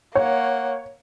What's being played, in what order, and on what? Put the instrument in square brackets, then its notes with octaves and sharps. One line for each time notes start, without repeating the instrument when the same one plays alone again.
[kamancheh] A#3 F#5 [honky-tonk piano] C#5